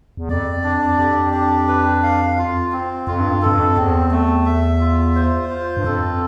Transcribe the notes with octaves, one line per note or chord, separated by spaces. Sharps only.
E2
F2 D5
D4
F2 G4
D4
B4
F5
F4
C4
F2 F4
G2
F2
G2 A4
F2
E2 C4
A3
E5
F4
C5
F4
G2
F2 A4